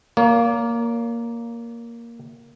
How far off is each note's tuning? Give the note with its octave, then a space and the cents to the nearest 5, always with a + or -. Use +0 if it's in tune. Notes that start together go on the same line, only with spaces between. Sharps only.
A#3 +0 C#5 +45